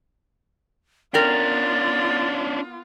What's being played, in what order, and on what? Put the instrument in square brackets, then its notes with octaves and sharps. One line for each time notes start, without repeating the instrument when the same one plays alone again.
[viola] B3 F4 [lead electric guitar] C#4 D4 [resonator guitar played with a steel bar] A#4 G5 [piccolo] A6